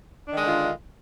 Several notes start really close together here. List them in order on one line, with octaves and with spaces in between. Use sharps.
D4 D#3 G#3 D3 F4